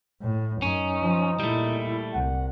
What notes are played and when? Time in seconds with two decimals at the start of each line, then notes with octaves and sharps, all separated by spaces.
0.22 A2
0.62 F#2 C#4 D#4
1.01 F3
1.40 A#2 G3 A3 E4
2.14 C2 F#5